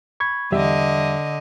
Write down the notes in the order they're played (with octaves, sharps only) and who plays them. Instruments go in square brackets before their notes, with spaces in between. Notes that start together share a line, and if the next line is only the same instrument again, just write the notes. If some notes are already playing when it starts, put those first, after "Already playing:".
[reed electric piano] B5 C#6 G#6
[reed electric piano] E2 G3 E5 [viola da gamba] D3 D#5